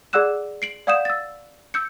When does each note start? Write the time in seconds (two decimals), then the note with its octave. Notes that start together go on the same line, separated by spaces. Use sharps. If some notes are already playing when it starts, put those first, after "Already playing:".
0.13 G#4 D5 F#5 E6 F#6 E7
0.62 C7 D7 F#7
0.87 D5 F5 F#5 D#6 G6 E7
1.05 E6 A6
1.74 E6 G6 C#7